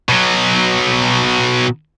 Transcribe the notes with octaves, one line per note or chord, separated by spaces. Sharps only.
B2 F#3